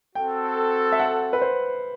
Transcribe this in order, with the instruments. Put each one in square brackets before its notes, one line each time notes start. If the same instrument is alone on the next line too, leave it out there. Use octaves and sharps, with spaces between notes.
[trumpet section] C4 F#4 A4 [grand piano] G5
[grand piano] E5
F#5
B4
C5